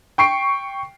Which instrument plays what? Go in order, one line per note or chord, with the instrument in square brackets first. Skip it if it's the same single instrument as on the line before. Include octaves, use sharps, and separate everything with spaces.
[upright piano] G5 C#6 C7 D7